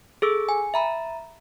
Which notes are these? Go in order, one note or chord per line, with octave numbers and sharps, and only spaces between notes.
G#4 A4 E6
G#5
E5 A#5 B5